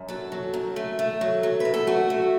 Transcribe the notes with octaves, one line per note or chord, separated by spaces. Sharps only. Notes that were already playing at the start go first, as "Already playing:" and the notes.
Already playing: F#2
F#3 A4
F#3
F#2
A3
A3
F#3
F#3
F#2 B4
A4
A3 F#4
A3